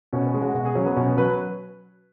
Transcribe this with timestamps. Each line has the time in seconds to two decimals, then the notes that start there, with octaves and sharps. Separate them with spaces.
0.13 B2 C#4
0.27 C#4
0.34 G#3
0.41 F#4
0.54 B2 F#4
0.65 G#4
0.75 F#3 C#4
0.86 B3
0.96 B2 C#4
1.07 C#4
1.17 F#3 B4